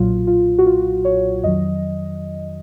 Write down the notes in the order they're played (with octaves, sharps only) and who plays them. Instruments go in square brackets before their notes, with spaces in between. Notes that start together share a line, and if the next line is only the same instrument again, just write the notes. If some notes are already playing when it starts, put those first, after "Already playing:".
Already playing: [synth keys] B1 A#2 F#3 F4
F4
F#4
F4
C#5
F2 D#3 F#3 D#5